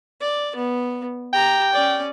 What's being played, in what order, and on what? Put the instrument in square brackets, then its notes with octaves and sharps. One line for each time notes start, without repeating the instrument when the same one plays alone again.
[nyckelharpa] D5
B3
[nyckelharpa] G4 A#5 [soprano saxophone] G5
[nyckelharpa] C#4 D5